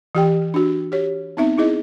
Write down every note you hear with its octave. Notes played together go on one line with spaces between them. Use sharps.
E3 G4 G5
D4 F#4
G4 C#5
B3 C4 D#4 E5
D#4 E4 G#4 D#5